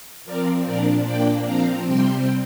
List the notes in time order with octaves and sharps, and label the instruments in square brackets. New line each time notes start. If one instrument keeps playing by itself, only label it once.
[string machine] F3 C4 A#4 D5
A#2 F3 D4 A#4 D5
A#2 A#3 D4 D5 G5
F3 C4 F5 A#5
C3 G3 C4 G5 C6